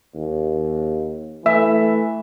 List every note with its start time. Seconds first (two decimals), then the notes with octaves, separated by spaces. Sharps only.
0.15 D#2
1.46 E3 A3 E5